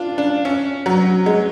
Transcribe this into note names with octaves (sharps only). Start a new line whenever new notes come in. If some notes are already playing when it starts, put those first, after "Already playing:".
Already playing: D4 F4
D4
C#4
F#3
G#3